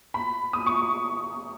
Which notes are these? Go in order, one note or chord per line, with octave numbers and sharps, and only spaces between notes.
B5
D#6
C#6